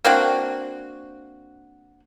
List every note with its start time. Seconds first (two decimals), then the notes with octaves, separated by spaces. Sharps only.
0.05 A#3 C4 D4 F#4